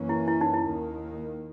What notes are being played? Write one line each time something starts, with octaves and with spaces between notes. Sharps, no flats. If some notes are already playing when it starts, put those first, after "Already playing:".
Already playing: F#2 E3 A#3 C#4
E4
E4
D#4
E4
D#2 D#3 A#3